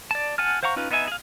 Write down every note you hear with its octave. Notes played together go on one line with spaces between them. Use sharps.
D5 A5
F#5 G#5 A5 F6
C5 F5 F#5 A#5 C#6
C#4 D#4 F4 B4
B3 D#4 D#5 E5 G#5
G#4 F5